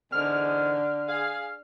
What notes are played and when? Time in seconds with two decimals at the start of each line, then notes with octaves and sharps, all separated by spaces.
0.12 E2 G#2 D3 F6
1.08 G#4 F5